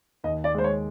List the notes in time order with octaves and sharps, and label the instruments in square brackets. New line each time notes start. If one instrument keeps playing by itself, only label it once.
[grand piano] D#2 [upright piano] D#5
[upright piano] D5
[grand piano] G#3 [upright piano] C5
[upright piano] C#5